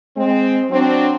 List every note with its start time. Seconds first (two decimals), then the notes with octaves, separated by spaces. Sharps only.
0.17 G#3 C4
0.71 F#3 C4 D4